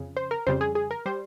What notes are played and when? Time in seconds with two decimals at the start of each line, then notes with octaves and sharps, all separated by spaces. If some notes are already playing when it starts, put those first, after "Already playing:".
Already playing: F2 C#3
0.17 C5
0.31 A#4
0.47 F2 C#3 G3 C5
0.61 G#4
0.75 G#4
0.91 A#4
1.06 G3 C5